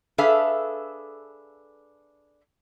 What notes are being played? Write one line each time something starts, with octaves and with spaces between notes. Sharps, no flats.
D4 G#4 A4 B4 E5 F5